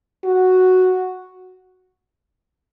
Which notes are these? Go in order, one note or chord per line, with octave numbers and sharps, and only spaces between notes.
F#4